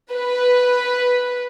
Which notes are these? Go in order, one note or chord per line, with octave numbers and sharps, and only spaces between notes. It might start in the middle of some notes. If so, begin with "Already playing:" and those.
B4